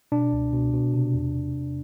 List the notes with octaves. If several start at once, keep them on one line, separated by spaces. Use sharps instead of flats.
B2 D4
C#2
B2
B2
C3
E2
C3
E2